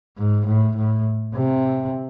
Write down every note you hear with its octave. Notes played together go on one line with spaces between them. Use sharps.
G#2
A2
A2
C3